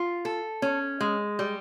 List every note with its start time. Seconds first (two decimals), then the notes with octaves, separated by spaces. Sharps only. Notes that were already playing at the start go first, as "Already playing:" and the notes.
Already playing: F4
0.25 A4
0.62 C#4
1.00 G#3
1.39 G3